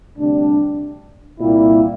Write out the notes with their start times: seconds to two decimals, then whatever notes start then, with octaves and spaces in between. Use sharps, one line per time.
0.16 D2 C3 G3 D4
1.39 C2 A#2 G3 A#3 E4